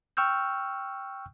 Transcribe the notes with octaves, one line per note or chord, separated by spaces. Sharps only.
G5 C#6 E6 F6 G6